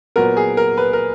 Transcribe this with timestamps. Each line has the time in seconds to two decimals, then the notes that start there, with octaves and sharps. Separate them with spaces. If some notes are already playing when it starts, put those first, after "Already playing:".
0.16 A#2 F#3 B3 A#4
0.37 G#4
0.57 A#4
0.78 B4
0.93 A#4